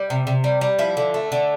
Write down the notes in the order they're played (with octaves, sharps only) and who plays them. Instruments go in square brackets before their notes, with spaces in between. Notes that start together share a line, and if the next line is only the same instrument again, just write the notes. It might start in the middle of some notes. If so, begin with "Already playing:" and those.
Already playing: [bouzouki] G3
C3
C3
G3
G3
F3 E4
D3
A3
D3